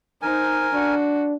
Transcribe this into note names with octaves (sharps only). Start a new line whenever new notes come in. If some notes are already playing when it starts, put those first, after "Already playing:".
D#4 A#4 C5 G#5
D4 F#4